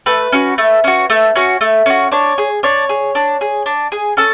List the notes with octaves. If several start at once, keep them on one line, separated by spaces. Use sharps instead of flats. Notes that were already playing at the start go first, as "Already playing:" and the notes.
A3 B4
C#4 F#4
A3
C#4 F#4
A3
C#4 F#4
A3
C#4 F#4
D4 C#5
G#4
D4 C#5
G#4
D4
G#4
D4
G#4
C#4 A4